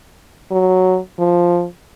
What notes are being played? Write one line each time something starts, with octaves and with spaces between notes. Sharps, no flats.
F#3
F3